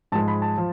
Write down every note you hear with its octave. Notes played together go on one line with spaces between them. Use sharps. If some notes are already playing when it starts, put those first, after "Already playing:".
G#2 F3 G#3 A5
B5
A5
F3